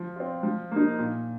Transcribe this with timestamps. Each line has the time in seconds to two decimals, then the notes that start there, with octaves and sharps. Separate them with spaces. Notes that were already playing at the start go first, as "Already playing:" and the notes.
Already playing: F3
0.16 C4 F4
0.43 F3
0.71 A#3 D#4
0.99 A#2